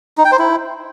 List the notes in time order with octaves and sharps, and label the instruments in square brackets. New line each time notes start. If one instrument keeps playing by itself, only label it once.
[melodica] D#4
G5
C5
E4